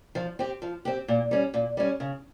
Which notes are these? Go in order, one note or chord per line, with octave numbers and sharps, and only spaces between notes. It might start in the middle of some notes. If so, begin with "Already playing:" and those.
F3
C4 G4
F3
C4 G4
A#2
G3 C#4
A#2
G3 C#4
C#3